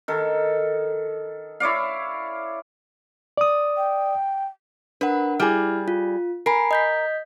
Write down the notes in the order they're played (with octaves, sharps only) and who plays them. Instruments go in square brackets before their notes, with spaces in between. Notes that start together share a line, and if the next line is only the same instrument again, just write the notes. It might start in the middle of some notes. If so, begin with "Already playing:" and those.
[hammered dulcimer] D#3 A4
E4 C#5 D5 F5
[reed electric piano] D5 D#6
[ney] G5
[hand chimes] D4 A#4 F#5 [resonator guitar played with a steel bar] B4
[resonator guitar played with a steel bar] G3 G#4 [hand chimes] E4 F6
[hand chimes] F4
[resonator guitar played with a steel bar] A#4 [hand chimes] G#5 B5 C7
[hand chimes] D#5 G6 B6